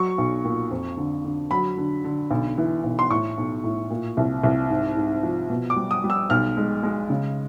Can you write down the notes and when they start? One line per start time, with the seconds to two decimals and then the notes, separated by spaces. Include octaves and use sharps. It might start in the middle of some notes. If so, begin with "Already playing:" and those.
Already playing: F#3 C#6
0.18 B1
0.45 A#2
0.71 F2
0.97 D3
1.24 D3
1.51 F#3 B5
1.77 D3
2.04 D3
2.31 B1
2.58 E3
2.84 B1
2.99 C6
3.10 A2 C#6
3.38 B1
3.64 A2
3.90 A#2
4.17 C2
4.44 C2
4.70 G#2
4.97 G#2
5.23 F3
5.50 B2
5.70 D6
5.76 G3
5.91 D#6
6.04 G3
6.10 E6
6.30 B1 F6
6.57 G#3
6.83 G#3
7.10 C#3